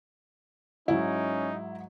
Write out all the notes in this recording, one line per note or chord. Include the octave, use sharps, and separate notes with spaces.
G#2 F#3 C#4 D#4 E4